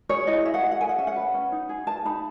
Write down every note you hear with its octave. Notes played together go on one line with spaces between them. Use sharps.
G#4 C#5
E4 D#5
G#4 E5
F#5
G#4
F#5
A4 G#5
F#5
C#4 E5
F#5
B4
C#4
D#4
G#4
B4 A5
D#4 B5